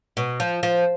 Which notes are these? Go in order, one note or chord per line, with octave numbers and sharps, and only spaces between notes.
B2
F3
F3